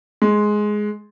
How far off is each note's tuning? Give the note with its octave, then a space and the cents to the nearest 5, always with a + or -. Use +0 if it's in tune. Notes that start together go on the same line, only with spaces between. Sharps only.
G#3 +10